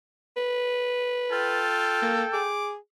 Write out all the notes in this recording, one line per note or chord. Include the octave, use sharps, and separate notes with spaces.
B4
F4 A4 G5
A#3
G#4 D6